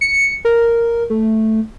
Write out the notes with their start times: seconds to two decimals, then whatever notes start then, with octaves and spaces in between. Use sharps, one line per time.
0.01 C#7
0.45 A#4
1.10 A3